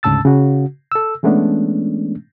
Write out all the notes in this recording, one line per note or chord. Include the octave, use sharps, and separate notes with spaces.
D2 G#2 C#3 A5 E6 A6
C#3 F#4
A4 E6
E3 G#3 A3 B3 C#4 D4